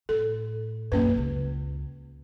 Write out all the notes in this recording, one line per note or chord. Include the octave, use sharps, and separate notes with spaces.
A2 A4
B1 F#2 A#3 C#4 B4
C#2